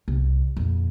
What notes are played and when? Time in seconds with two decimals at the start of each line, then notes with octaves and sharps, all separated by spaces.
0.08 C2
0.57 F2 A#2